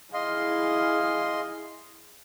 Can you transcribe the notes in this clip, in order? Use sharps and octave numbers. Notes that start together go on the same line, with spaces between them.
E4 G#4 D#5 F5 C6